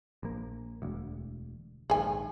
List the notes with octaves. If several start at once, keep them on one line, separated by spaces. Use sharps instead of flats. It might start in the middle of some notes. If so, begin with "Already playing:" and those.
A#1 A#3
E1 D2
A#1 D#2 G#2 G#4 G#5